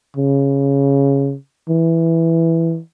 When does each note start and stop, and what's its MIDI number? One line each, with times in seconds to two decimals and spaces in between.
0.16 1.35 49
1.69 2.79 52